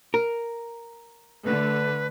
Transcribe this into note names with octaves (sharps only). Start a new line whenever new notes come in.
A#4
D3 A3 B4